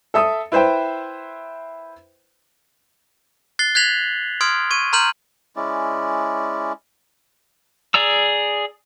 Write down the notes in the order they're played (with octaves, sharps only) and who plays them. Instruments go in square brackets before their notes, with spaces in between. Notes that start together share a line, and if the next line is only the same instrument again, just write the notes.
[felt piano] A4 E5 D#6
E4 B4 C5 E5 G5
[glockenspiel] F#6 A6 C7 G7
F#6 G#6 B6 F7 F#7
C6 D#6 F6 G#6 D7
C#6 G#6 D#7
A#5 C6 F6 G6 D#7 F#7
[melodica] G#3 C#4 E4 D5
[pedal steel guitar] G#4 D5 A#5 E6